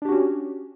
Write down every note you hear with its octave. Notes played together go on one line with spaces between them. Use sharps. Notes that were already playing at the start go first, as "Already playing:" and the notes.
C#4 D4 F#4 G4